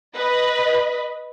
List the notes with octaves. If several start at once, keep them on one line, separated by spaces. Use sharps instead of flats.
B4 D#5 B5